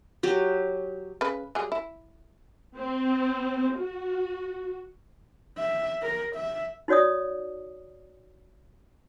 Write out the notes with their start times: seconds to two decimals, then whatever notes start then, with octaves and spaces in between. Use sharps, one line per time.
0.23 F#3 G4
1.21 C#3 B4
1.55 F#3 G3 G#4
1.72 E4
2.78 C4
3.76 F#4
5.58 E5
6.02 A#4
6.36 E5
6.88 D#4 F#4 C#5 D5 D#6